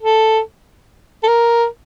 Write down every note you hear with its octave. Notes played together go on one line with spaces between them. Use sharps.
A4
A4
A#4